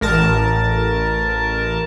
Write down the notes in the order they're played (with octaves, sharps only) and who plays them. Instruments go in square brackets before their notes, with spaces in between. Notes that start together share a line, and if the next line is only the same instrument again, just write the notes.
[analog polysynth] A1 A#4 A5